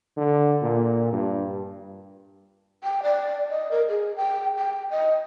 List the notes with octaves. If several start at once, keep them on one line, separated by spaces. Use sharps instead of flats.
D3
A#2
G2
G5
D5
D#5
A#4
G#4
G5
G5
D#5